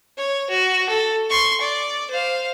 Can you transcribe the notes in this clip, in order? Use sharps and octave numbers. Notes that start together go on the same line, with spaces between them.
C#5
F#4
A4
C6 C#6
D5
C5 F5